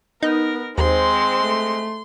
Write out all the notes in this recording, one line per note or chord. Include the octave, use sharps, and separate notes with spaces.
B3 D#4 A#4
D#2 G#3 C4 C5 C6
A3